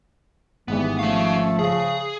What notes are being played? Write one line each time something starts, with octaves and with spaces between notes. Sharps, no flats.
G#1 G#2 E3 G3 B3
F3 A3 C#4 F5
C#3 G#4